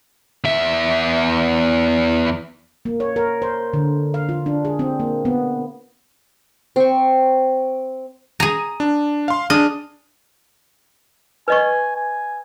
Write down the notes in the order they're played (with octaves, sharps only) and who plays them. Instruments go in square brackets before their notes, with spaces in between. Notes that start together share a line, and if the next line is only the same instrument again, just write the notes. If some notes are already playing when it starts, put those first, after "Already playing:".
[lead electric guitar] E2 E5
[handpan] A#3
C#5
A#4
C5
D3
F5
F4
D4
G#4
C4
A#3
B3
[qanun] C4 C#6
[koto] G#4 A#5 [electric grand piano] D#7
[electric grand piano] D4
F5 C6
[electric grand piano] D4 G#4 F6 [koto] D#5
[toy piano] B4 D#5 C#6 [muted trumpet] G#5
[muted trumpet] G#5